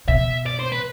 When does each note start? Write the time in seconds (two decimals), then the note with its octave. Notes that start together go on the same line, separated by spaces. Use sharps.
0.08 B2 E5
0.46 D5
0.59 C5
0.72 B4